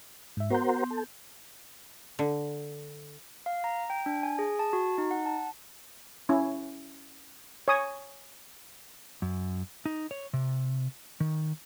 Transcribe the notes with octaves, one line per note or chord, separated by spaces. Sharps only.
G#2 E5
B3 F#4 A#4 C5 C6 G6
A4
D3
F5
A#5
G5
D4
G#5
G#4
A5
F#4
D#4
F#5
A5
C#4 E4
C#5 G#5 D#6
F#2
D#4
C#5
C3
D#3